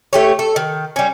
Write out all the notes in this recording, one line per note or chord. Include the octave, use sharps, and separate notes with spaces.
A3 G4 C#5
A4
D#3
G3 C#4